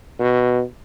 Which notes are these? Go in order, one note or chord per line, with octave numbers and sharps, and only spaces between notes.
B2